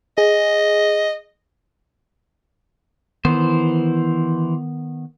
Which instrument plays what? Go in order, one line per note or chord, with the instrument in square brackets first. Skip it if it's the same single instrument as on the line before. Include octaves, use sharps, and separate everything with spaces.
[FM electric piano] G#4 [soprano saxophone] D#5
[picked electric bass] D#3 B3 [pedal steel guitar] E3 C5